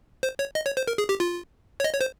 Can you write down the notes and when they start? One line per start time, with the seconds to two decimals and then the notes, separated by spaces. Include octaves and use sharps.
0.23 C5
0.39 C#5
0.55 D#5
0.66 C#5
0.77 C5
0.87 A#4
0.98 G#4
1.09 G4
1.20 F4
1.80 C#5
1.84 D#5
1.93 C#5
2.01 C5